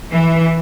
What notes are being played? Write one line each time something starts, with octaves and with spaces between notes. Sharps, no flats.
E3